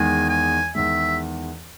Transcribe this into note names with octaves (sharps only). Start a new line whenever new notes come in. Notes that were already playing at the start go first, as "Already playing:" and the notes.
Already playing: E2 D#3 G#3 G#5
G#5
E2 D#3 G#3 E5